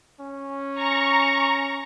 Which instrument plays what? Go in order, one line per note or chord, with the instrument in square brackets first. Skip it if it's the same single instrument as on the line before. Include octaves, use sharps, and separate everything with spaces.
[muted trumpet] C#4
[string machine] A#5 C#6